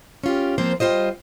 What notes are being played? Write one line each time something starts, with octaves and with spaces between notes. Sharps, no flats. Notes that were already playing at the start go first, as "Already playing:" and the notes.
C#4 F4 G4
F3 A#3 C4 F4 C5
G3 F4 C5 D#5